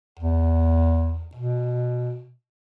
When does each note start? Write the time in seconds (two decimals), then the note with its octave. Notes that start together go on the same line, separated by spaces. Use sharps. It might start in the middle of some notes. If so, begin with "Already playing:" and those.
0.19 E2
1.35 B2